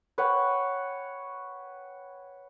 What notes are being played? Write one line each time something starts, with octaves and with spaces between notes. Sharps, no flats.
B4 C#5 F#5 G5